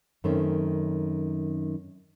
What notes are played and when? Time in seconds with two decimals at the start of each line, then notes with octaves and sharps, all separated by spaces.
0.24 F#2 D#3 A3 C4 C#4